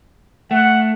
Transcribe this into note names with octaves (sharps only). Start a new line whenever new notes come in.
A3 F#5